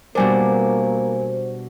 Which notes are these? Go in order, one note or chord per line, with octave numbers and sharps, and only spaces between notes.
B2 G3 A#3 D4 A#4 C5 G#5